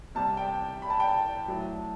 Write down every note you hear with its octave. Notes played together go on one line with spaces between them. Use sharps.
C3 G3 A5
G5
B5
A5
G5
A5
A2 F#3